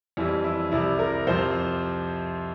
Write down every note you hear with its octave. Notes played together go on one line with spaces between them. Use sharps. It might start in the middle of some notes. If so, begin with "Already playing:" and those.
F2 E3 G3 E4
E4
C2 C3 G3 E4
A#4
F2 C3 F3 C5